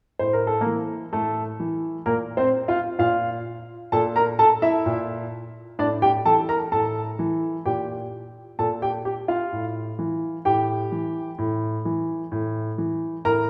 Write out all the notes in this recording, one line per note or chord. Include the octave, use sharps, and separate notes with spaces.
A2 C5
A#4
A4
E3 A#3 A#4
A2 A3 A4
E3
A#2 A#3 A#4
C4 C5
F4 F5
A#2 F4 F5
A#2 A4 A5
A#4 A#5
A4 A5
E4 E5
A#2
A2 D4 D5
G4 G5
E3 A4 A5
A#4 A#5
A2 A4 A5
E3
A#2 G4 G5
A#2 A4 A5
G4 G5
G4 G5
F4 F5
A2
E3
A2 G4 G5
E3
A2
E3
A2
E3
A2 A#4 A#5